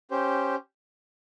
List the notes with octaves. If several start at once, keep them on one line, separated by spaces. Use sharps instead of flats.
C#4 G4 C5